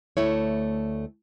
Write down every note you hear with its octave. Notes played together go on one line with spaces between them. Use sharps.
D2 A3 E4 C#5